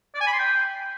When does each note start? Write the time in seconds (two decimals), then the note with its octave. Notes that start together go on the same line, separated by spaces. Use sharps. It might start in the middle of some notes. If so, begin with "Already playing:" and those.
0.14 D5
0.21 G#5
0.27 B5
0.33 C6
0.39 G5